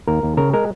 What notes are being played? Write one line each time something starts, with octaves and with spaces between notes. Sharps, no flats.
D#2 A#4
D#2
C#3 A#4
G#3 A#4